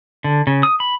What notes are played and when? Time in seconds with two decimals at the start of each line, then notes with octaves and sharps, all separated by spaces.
0.24 D3
0.47 C#3
0.63 D#6
0.80 B5